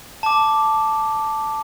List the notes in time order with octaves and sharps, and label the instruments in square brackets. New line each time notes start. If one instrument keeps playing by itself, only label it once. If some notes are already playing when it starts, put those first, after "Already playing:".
[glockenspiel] A5 D6